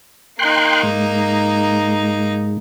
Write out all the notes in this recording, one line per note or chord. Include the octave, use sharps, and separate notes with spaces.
A#3 D#4 G5 C6 F#6
G#2